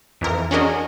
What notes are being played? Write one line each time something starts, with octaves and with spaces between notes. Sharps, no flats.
F2 E3 A#4
C#4 D4 F#4 G#4 A#4 D#5